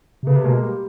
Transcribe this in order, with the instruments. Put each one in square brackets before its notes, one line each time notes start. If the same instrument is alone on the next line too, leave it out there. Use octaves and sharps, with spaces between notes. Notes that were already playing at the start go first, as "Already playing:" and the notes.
[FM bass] C3
[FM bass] C#3 [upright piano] A3 B3
[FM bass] C3
[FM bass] B2 [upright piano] G#3 A#3
[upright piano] G3